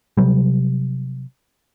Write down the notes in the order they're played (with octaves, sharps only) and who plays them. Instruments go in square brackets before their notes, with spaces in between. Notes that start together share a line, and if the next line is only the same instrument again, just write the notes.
[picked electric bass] C3 F#3 G3